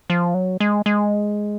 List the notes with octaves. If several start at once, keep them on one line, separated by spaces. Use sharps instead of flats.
F3
F#3
G#3
G#3